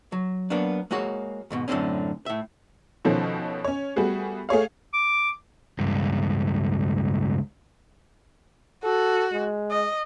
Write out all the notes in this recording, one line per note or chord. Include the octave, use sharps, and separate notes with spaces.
F#3
F#3 A#3 B3 D4
G#3 A#3 F#4 C#5
D#2 G#2 B2
F#2 A2 D3 C4 C#4
A2 E5
B2 D#3 F3 C#4 A4
C#4 C#5
G3 A3 B3 F#4 G#4
A3 G#4 C#5 F5
D6
C#2 G2
F#4 A4
G#3
D#5